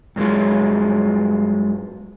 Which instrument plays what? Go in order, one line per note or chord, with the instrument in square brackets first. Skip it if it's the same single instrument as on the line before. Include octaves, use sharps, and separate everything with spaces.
[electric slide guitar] G2 F#3 G#3 F4